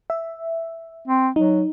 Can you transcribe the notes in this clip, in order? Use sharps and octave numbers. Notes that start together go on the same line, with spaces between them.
E5
C4
F#3 D#4